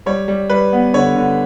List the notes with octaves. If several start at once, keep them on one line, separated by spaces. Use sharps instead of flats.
G3 C#5
G3
G3 B4
B3
D3 C#5
D3